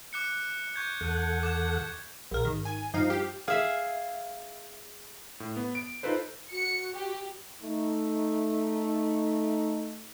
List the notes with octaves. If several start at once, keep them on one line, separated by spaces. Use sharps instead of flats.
D6 F#6 C#7
C#6 G6 G#6
E2 A4 F#5
D6 G#6 E7
A#1 A#4
G#1 D#3
G#5
G2 F3 D#4 F5
G4
G#4 E5 F5
A2
B3
D7
D#4 F4 A4 B4 C5
F#4 C#7
G4
A3 D#4